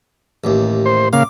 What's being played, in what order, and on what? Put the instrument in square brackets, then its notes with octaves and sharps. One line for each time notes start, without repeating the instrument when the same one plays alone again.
[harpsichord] A1 D#2
[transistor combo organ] C5
[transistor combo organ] C#3 A#3 F5 [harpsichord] D6